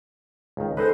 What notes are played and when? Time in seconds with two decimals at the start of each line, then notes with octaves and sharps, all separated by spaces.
0.57 C#2 D#3
0.77 G#3 D#4 A4 B4 C5